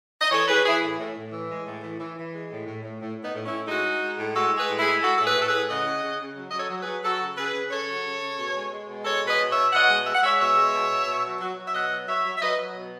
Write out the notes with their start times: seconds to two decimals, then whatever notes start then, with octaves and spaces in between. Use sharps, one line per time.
0.22 D#5
0.31 E3 A4 C#5
0.48 E3 G#4 B4
0.65 E3 E4 G#4
0.82 A2
0.99 A2
1.15 A2
1.32 E3
1.49 G#3
1.66 A2
1.83 E3
1.99 E3
2.16 E3
2.33 G#3
2.50 A2
2.66 A2
2.83 A2
3.00 A2
3.17 A2
3.23 B3 D#4
3.33 A2
3.45 C#4 E4
3.51 A2
3.68 G#3 D#4 F#4
3.84 G#3
4.01 G#3
4.18 A2
4.34 G#3 F#4 A4
4.51 G#3
4.57 G#4 B4
4.68 A2
4.79 E4 G#4
4.85 G#3
5.01 G#3 F#4 A4
5.17 A2 A4
5.24 G#4 B4
5.35 A2
5.41 A4
5.47 G#4 B4
5.52 A2
5.69 C#3 D#5 F#5
5.86 C#3
6.03 C#3
6.20 C#3
6.36 F#3
6.50 F#3 D#5
6.58 A4 C#5
6.70 F#3
6.81 G#4 B4
6.86 F#3
7.04 F#3 F#4 A4
7.21 C#3
7.37 C#3 G#4 B4
7.54 C#3
7.71 C#3 A4 C#5
7.87 F#3
8.04 C#3
8.22 C#3
8.38 B2
8.55 G#3
8.72 G#3
8.89 B2
9.05 G#3 A4 C#5
9.22 B2
9.27 B4 D#5
9.38 B2
9.50 C#5 E5
9.56 B2
9.72 B2 D#5 F#5
9.89 G#3
10.06 G#3 E5
10.15 F#5
10.22 G#3 C#5 E5
10.39 B2 C#5 E5
10.56 G#3
10.73 B2
10.90 B2
11.06 B2
11.24 F#3
11.40 F#3
11.57 F#3
11.68 E5
11.74 B2 D#5 F#5
11.91 F#3
12.07 F#3 C#5 E5
12.25 F#3
12.37 E5
12.41 F#3 B4 D#5
12.58 F#3
12.75 B2